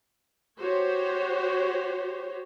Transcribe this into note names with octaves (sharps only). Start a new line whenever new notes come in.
F#4 G4 C5 C#5